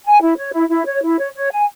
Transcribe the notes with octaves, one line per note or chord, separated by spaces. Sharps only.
G#5
E4
C#5
E4
E4
C#5
E4
C#5
C#5
G#5